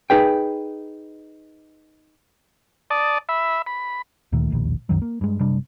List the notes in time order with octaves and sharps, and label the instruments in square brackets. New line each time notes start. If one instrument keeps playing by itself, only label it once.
[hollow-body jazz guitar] D#4 G#4 B4 G5
[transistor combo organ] D5 A5 D#6
E5 B5
B5
[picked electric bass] D2 A#2 D#3 A3
E1 A#1 D#2
C2 F#2 D#3 F#3
A#3
G2 G#3
F#1 C3 G3 D4